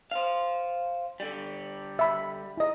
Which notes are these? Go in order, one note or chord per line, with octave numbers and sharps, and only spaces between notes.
C5 F5
D3 G3
E5 B5
E4 D#5